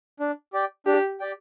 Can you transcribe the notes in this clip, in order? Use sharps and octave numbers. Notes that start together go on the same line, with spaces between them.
D4
G4 D5 G5
D4 G4
G4 D5 G5